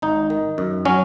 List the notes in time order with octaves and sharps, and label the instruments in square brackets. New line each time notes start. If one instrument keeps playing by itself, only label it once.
[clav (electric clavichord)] G#1 D#4
D#3
F#2
F#3 C#4